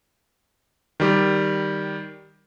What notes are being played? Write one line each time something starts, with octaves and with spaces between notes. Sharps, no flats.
D#3 G3 G4